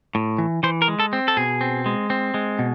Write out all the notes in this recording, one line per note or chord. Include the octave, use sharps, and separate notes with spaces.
A2
E3
E3 C5
A#4
G#3
A4
C4
A4
B2 G#4
C4
G#3
C4
G#3
B2